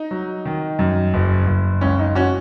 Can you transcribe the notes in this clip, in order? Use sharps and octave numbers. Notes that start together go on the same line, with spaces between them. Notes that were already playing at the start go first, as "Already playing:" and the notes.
Already playing: D#4
F#3
D#3
F#2
F#1
F#1
C#2 C#4
D#4
C#4 F#4